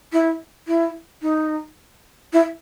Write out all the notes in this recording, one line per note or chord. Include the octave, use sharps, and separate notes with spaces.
E4
E4
D#4
E4